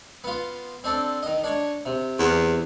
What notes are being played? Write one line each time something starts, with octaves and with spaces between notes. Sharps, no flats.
B3 F4
C4 D4 A4
D#3 D#5
D4 C#5 C#6
C3
E2